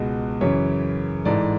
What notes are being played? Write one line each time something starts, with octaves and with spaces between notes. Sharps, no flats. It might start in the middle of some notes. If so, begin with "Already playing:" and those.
Already playing: C#2 B2 G#3 B3
F#2 C#3 E3 C#5
A1 G#2 E3 A3 D5